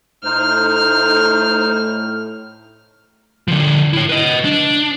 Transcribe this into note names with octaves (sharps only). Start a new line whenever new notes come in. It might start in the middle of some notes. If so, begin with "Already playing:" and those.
A2 A3 D#4 C5 F6
D3 F3
E4 C#5
B4 D#5
D4